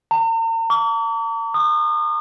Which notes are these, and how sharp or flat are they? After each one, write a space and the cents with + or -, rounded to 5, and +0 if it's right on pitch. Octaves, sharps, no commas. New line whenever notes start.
A#5 -45
D6 -45
D#6 -35